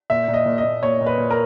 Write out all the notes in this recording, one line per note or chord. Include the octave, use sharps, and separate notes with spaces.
A#2 E5
A#2
D#5
A#2
D#5
A#2
A#2 C#5
A#2
B4
A#2
A#4